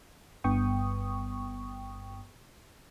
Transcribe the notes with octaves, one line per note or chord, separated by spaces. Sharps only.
G1 G2 B3 G5 C#6 D#6